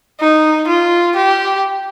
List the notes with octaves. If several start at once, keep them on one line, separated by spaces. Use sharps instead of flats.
D#4
F4
G4